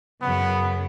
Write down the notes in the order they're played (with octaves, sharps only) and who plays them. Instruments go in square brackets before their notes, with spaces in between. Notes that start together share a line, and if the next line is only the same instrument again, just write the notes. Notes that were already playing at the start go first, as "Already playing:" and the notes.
[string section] F#2 C#3 [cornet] B3